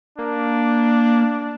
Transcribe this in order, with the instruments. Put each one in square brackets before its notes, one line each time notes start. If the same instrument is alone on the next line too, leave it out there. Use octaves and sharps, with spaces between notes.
[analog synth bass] A#3 [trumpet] D4